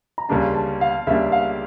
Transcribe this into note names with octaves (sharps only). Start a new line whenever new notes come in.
A#5
C#2 C#3 G3 A#3 D4 A5
A5
F5
C#2 C#3 G3 A#3 D4 E5
F5